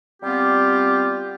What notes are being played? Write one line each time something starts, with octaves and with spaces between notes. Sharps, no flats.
G3 B3 C4 F4 G4